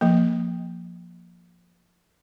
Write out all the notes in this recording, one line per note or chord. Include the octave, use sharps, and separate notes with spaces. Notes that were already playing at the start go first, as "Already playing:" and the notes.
F3 A#3